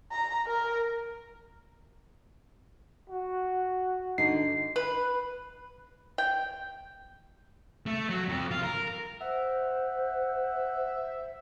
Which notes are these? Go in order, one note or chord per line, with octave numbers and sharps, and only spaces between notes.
A#5
A#4
F#4
D3 D#4 C7
B4
G5
A3
F#3
F2
F4
A#4
C5 E5 F#5